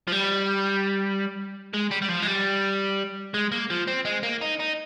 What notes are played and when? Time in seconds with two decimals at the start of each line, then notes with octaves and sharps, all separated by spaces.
0.07 F3
0.12 G3
1.73 G#3
1.91 G3
2.02 G3
2.09 F3
2.22 G#3
2.27 G3
3.34 G#3
3.52 A#3
3.70 F3
3.88 C4
4.05 G#3
4.23 A#3
4.41 D#4
4.59 D#4